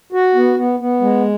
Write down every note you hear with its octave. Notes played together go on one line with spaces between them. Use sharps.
F#4
B3
B3
B3
G#3